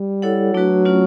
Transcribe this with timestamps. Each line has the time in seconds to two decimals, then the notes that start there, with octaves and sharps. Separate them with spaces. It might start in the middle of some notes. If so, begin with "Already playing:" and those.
Already playing: G3
0.22 E4 A4 C#5 F#5
0.53 F#3 A3 D4 F#4 B4
0.85 A3 C#4 F4